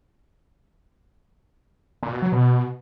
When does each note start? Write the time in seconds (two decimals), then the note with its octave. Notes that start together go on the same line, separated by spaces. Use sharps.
2.03 A#2
2.12 B2
2.22 F#3
2.32 B2